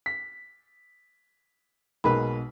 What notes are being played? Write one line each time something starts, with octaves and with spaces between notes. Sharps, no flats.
B6
B1 B2 G#3 A#3 B4 B5